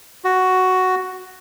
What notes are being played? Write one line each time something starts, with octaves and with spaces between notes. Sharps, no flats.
F#4